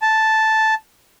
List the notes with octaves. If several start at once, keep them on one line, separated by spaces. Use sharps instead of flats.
A5